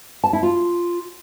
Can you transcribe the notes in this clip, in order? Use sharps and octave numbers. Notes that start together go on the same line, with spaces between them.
A5
E4
F4